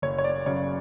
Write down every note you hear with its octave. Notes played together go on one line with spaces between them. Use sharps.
F#1 C#5
C#5
D5
F#2 C#3 C#5